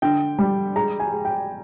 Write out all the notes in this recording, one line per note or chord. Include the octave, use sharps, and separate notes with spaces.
D3 G5
G3
G#3 A#5
G#5
G#3
G5